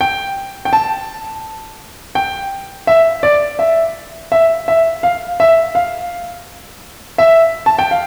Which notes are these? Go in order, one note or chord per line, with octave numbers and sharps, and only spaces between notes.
G5
G5
A5
G5
E5
D5
E5
E5
E5
F5
E5
F5
E5
A5
G5
F5